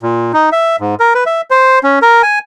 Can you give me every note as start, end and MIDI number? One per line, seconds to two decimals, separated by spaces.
0.03 0.32 46
0.33 0.50 63
0.52 0.76 76
0.80 0.95 44
1.00 1.13 70
1.15 1.24 71
1.26 1.41 76
1.51 1.79 72
1.83 1.99 61
2.02 2.22 70
2.23 2.39 80